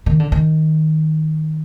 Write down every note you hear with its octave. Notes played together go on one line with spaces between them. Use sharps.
D#3
D3
D#3